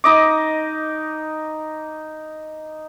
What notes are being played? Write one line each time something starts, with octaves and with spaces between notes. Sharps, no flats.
D#4 D#5 D6